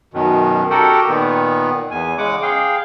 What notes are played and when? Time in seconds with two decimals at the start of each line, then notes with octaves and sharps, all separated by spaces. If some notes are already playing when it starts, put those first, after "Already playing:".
0.14 F#2 B2 D#3
0.70 F#4 G4 A4 A#4 F#5 G5
1.08 A#2 D#3 B3
1.91 E2 G#5
2.18 C#3 G#3 F#5 D6
2.42 G#4 F5 G5